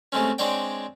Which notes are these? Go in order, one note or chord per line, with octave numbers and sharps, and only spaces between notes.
C3 G#3 A3 C4 C#4
G#3 C4 D4 C#5 D5 G5